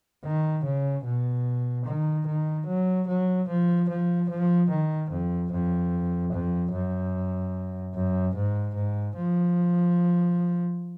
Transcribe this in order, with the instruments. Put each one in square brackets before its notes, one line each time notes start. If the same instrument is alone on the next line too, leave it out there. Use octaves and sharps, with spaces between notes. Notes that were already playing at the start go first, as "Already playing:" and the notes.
[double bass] D#3
C#3
B2
D#3
D#3
F#3
F#3
F3
F3
F3
D#3
F2
F2
F2
F#2
F#2
G#2
G#2
F3